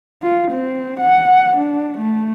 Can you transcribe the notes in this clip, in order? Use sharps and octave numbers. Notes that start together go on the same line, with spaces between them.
F4
C4
F#5
D4
A3